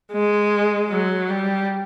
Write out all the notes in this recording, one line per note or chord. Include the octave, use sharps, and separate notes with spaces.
G#3
F#3
G3